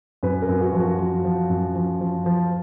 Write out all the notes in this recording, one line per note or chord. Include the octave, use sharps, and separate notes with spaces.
F#2 B4
A#4
F#2
F#4
F3
F#4
F3
F3
F#2
F3
F3
F3